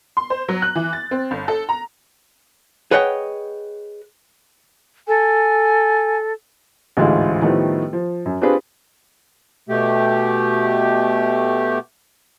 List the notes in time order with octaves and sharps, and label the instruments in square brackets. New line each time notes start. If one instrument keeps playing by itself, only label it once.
[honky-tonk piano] C6
C5
F#3
F#6
E3
A6
C4
G1
A4
A#5
[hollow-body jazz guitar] G#4 B4 C#5 D#5 F#5 G5
[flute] A4 [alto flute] G#5
[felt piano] A1 D2 G#2 G#3 E4 F4
A2 D#3 F3 G3 A3 B3
F3
F#2
C4 D4 F4 G4 G#4 B4
[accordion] B2 A3 G4